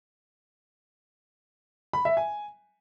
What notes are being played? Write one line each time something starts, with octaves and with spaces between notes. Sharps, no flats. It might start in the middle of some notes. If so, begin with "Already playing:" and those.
B5
E5
G#5